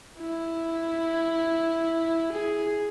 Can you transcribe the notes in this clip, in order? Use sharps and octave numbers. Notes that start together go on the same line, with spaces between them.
E4
G#4